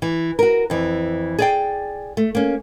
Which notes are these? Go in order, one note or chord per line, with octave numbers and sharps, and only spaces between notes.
E3
F#4 A#4
F2 E3
G#4 D5 G5
A3
A#3 C#4